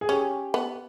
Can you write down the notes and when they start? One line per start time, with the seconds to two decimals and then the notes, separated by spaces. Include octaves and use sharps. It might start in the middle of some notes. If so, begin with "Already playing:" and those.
0.01 G#4
0.09 C#4 G4
0.54 B3